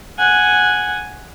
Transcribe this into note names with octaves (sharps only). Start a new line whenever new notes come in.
F#5 G#5